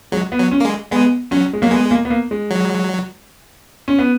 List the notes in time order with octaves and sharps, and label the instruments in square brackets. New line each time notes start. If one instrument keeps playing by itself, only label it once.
[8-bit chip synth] F#3 [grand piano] G#3
[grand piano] B3
[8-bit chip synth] F#3
[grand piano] C#4
[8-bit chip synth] A#3
G#3
[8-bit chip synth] G#3 [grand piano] B3
[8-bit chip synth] F#3 [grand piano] C#4
[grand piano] G#3
[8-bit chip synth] F#3 [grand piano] A#3
[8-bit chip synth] G#3 [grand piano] B3
[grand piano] A#3
B3
A#3
G#3
[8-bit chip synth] F#3
[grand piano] C#4
B3